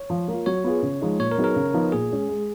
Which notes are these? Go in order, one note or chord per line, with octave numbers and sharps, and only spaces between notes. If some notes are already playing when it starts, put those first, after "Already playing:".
Already playing: C#5
F3
A#3 F4
F#3 C#5
B3 F4 G#4
C#3
F3 G#3 D#4
A#2 C#5
A#4
F#3 B3 D#4 G#4
A#4
C#3
F3 B3 D#4
A#2 G#4
G#3 C#4
G#3